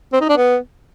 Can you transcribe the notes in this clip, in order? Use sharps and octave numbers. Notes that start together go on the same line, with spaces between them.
C4
D#4
D4
B3